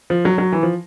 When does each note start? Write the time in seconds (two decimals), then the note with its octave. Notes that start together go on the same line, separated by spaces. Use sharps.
0.10 F3
0.25 F#3
0.38 F#3
0.52 E3
0.63 F3